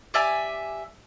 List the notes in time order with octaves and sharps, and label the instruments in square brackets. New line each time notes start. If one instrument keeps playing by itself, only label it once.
[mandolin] G4 D5 E5 G#5